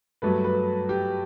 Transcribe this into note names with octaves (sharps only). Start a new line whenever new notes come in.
G2 F#3 A3 B4
B4
G4